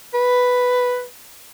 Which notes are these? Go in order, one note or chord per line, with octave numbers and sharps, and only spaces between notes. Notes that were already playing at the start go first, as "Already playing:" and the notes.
B4